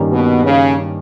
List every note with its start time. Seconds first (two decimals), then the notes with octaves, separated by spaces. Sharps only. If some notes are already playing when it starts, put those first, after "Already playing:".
Already playing: G2 D#3 G3 A#3 C#4
0.11 B2
0.45 C#3